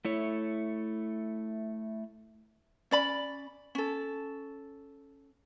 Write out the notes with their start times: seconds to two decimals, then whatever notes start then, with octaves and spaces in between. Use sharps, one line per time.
0.05 A3 E4 C#5
2.91 C#4 D5 B5
3.75 C#4 A4